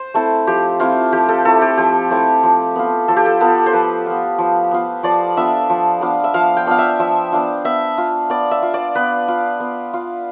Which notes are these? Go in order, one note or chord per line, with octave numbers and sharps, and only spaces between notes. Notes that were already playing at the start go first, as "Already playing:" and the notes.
Already playing: C5
A3 C4 E4 A4
F3 G4
A3 C4 E4 F4
F3 G4
A4
A3 C4 E4 A4
G4
F3 G4
A3 C4 E4
F3
B3 F4
F3 A4
G4
A4
B3 F4 A4
C5
F3 B4
B3 F4
F3
B3 F4
F3 D5
B3 D4 F4 E5
F3
B3 D4 F4
E5
F3 F5
G5
B3 D4 F4 F5
E5
F3 E5
B3 D4 F4
B3 E5
F4
B3 D5
E5
F4
D5
B3 B4
F4
B3
F4